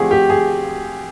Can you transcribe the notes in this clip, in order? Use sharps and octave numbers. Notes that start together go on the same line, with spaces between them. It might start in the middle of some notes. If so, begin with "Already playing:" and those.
Already playing: D3 F3 A3 C4 G4 G#4
G4
G#4